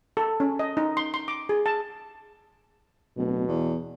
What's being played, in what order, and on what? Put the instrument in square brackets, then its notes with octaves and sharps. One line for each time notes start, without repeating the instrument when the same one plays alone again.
[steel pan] A4
C#4
D#5
D#4
C6
C6
D6
G#4
A5
[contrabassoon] D1 [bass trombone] B2
[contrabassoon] E2